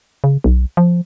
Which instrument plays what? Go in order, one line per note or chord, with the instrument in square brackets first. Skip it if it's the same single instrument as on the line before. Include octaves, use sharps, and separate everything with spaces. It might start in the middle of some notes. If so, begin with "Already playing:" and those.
[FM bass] C#3
B1
F3